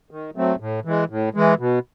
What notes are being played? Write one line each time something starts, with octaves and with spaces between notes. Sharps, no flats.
D#3
F#3 A3 C4
A2
E3 G#3
A2
E3 G#3
B2